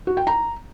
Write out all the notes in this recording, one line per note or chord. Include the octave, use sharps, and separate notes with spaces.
F#4
G5
A#5